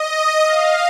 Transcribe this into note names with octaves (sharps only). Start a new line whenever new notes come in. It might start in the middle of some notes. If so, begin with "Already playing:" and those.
Already playing: D#5
F5